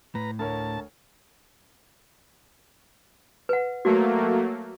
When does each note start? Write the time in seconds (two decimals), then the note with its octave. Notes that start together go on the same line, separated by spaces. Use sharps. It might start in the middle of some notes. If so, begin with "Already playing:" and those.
0.15 A2 B4 A#5
0.39 D2 A#4 C#5 A5
3.49 B4 F#5
3.85 F#3 A3 A#3 F#4